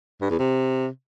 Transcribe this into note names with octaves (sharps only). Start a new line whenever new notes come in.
G2
E2
C3